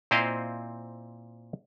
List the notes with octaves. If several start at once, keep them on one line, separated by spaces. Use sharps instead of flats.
A#2 C4 E4 C5 D#5 F5